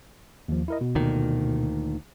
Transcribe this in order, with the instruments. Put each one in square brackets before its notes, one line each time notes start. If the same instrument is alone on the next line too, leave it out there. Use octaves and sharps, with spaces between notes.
[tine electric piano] D#2 F3
E4 A#4 D#5
B2
[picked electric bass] D2 A#2 D#3